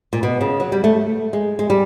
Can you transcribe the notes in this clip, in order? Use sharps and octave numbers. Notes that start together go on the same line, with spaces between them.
A#2
B2
C#3
F#3
G3
A3
G#3
G#3
G3